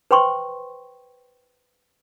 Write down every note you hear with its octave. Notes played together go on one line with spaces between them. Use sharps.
B4 C5 G5 C6 C#6